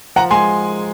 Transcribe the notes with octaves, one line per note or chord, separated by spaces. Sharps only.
F3 F#5 A#5
G#3 G#5 C6